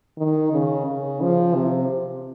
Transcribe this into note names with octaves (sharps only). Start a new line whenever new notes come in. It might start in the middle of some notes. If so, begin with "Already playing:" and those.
D#3
C#3
C#3
F3
C3